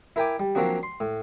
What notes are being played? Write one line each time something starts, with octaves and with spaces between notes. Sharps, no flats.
E4 A#4 E5 G5 G#5 D6
G3
F3 F#3 A#3 C4 D4 F#4
C6
A2